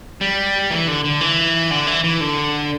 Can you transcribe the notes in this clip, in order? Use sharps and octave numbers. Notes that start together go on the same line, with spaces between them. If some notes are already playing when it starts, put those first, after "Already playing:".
G3
E3
D3
D3
E3
D3
E3
E3
D3